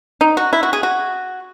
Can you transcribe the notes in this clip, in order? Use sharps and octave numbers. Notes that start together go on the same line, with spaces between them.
D#4
F#4
E4
F#4
G#4
F#4